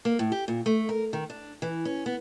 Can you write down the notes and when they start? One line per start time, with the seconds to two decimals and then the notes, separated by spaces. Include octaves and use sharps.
0.05 A#3
0.19 A2
0.32 G4
0.48 A#2
0.66 A3
0.89 A#4
1.13 D#3
1.30 D4
1.62 E3
1.85 C#4
2.06 B3